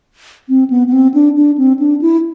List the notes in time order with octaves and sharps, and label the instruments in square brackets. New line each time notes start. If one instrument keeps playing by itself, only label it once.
[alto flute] C4
B3
B3
C4
D4
D4
C4
D4
E4